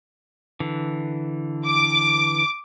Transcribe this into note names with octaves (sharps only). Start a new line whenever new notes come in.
D3 E3
D6